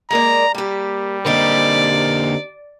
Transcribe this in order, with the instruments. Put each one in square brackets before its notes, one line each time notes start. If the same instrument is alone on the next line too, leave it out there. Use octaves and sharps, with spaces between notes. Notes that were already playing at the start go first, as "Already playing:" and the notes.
[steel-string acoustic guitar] G#3 A#3 D5 [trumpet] A#5
[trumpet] G3 [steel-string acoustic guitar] A#3 G4
[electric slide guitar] D3 A#3 [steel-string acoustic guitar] C4 D#4 G4 [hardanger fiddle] D5